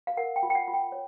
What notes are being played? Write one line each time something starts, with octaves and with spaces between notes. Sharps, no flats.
F5
A#4 F#5
G5
F4
G5
F#5
F4
G5
C#5